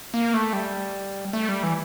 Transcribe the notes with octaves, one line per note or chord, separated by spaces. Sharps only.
A#3
A3
G3
A3
G3
E3